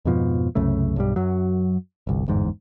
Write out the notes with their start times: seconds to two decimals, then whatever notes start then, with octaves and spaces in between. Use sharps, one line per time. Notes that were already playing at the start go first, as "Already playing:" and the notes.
0.05 F2 G#2 B2 F3
0.55 C2 F#2 C#3 A3
0.96 B1 G2 G3
1.16 F#2 F#3
2.07 G1 C2
2.28 G1 E2 G#2